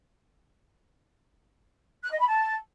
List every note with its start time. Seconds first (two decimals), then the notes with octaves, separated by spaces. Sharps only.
2.02 F#6
2.11 D#5
2.19 B5
2.27 A5